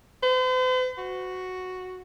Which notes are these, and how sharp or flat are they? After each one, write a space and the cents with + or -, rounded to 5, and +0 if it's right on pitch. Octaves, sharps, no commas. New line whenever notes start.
C5 -45
F#4 -5